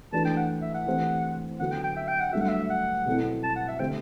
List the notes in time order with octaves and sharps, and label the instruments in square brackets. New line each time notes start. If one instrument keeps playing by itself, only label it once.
[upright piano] E3 A3 D4 F#4 B4 [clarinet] A5
[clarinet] G5
F#5
E5
F#5
[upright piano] E3 A3 C4 G4 C5
[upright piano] D3 F#3 B3 F#4 A4 [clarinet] F#5
[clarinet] G5
G5
E5
G5
F#5
[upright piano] G2 F#3 A3 D4 F#4 [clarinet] E5
[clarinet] F#5
E5
F#5
[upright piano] B2 F#3 C4 E4 A4
[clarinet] A5
F#5
E5
[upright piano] D3 A3 C4 G4 C5 [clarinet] G5